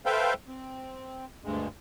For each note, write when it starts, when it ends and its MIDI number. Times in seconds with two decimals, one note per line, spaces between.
0.06 0.34 69
0.06 0.34 71
0.06 0.34 72
0.06 0.34 76
0.06 0.34 77
0.06 0.34 79
0.48 1.25 60
1.44 1.68 38
1.44 1.68 43
1.44 1.68 56